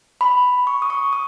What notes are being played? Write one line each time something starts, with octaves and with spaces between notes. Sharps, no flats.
B5
C#6
D#6
C#6
D#6